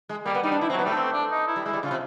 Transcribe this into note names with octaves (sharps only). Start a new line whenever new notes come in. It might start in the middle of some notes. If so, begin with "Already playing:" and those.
G#3
G3 A#3
B3
G3 D#4
D4
E4
C4
F#3
B3
G3 A3
C4
D4
D#4
E4
G3
G#3 E4
G3
C#3 F4
C3